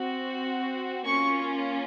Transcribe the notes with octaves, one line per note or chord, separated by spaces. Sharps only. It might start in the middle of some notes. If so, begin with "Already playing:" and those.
Already playing: C4 F#4
A#3 C#4 F4 C#6